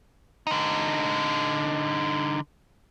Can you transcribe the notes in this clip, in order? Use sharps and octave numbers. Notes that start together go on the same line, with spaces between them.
D3 D#4